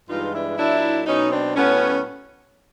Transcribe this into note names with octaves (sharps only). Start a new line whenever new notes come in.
G2 E3 G#3 D#4 F4
D4 E4
A#2 F#3 D4 E4
B2 F#3 C#4 D#4
C4 D4
A2 F#3 B3 C#4